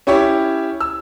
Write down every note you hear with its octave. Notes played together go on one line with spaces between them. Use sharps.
C#4 E4 G4 C#5
E6